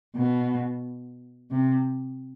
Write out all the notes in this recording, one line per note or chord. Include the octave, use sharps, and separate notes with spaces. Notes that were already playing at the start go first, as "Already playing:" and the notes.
B2
C3